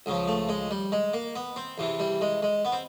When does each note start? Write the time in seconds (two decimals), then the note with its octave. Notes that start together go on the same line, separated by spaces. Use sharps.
0.06 C#2 C#3 F3
0.28 A3
0.49 G#3
0.71 G3
0.92 G#3
1.13 A#3
1.36 B3
1.56 C4
1.78 E2 C3 E3
2.00 G3
2.21 G#3
2.42 G#3
2.65 B3
2.72 C4